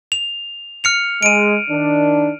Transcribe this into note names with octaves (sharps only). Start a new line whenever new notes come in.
F7
F6 C#7 F7
G#3 D7 D#7
D#3 D4